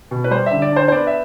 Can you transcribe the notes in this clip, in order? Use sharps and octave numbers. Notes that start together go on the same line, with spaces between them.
B2
B4
G3 C5
D3 E5
D5
D4 C5
C5
B3 D5
E5